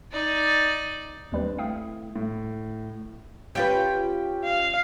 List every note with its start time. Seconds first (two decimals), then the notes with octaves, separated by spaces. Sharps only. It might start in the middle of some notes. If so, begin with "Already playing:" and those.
0.12 D#4 D5
1.32 D#2 G3 C4 D4 B4
1.58 A3 E4 F5 G5 D#6
2.16 A2
3.55 C#4 F4 G4 B4 G5
4.44 F5